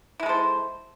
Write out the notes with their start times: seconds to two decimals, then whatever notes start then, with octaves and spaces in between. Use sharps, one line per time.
0.20 E4
0.23 G#3
0.26 A4
0.29 C5